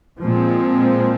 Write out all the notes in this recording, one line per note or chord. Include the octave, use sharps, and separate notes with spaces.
A#2 F3 G#3 C4